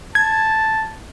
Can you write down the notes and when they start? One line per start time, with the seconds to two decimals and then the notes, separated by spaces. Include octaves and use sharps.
0.15 A5 G#6